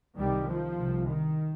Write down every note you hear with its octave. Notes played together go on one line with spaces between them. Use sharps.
C2 C3 D#3 G3
F3
C2 C3
D#3